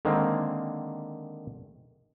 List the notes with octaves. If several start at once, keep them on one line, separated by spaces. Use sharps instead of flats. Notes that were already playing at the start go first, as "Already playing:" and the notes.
D3 D#3 G#3 A#3 C4